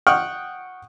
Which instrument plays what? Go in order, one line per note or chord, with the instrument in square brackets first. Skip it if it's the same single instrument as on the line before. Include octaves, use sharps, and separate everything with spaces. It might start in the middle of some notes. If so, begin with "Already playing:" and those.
[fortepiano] F#5 G5 C#6 D#6 F6